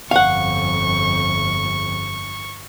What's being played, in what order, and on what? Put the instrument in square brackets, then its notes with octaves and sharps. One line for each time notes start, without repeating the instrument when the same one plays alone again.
[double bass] G1 F2 [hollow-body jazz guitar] F5 F#5 [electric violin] C#6